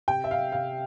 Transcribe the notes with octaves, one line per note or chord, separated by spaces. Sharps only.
C3 G5
E5
F5
C3 F5